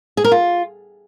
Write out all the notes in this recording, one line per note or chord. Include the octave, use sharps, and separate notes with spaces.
G#4
A#4
F4